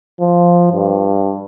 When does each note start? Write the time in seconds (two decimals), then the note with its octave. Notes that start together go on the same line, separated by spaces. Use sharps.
0.21 F3
0.73 G2